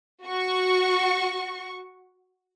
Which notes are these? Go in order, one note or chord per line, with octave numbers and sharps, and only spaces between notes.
F#4 C#6